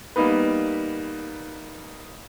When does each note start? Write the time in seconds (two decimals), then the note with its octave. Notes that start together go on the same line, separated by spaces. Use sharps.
0.16 G3 A#3 B3 D#4 B4